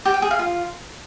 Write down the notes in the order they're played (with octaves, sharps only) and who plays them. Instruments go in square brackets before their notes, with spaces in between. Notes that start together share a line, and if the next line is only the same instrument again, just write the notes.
[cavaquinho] G4
G5
G#4
F5
F4